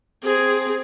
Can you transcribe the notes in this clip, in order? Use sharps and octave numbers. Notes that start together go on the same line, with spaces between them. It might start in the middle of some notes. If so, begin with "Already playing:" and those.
C4 G#4